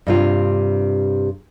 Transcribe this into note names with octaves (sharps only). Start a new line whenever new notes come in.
G2 C3 F4